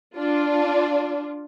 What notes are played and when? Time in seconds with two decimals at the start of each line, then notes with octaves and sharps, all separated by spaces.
0.16 D4 F4